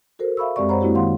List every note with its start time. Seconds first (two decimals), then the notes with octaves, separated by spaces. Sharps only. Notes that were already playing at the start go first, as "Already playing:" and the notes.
0.19 F#4 A4 A#4 C5
0.37 E5 F5 B5 C#6 E6
0.56 F#2 G#3 C4 G4 D5 C#6
0.69 C5 C#5 F#5 A#5 B5
0.81 G#3 A#3 C4 E4 F#4 G4
0.95 D#3 F5 F#5 C6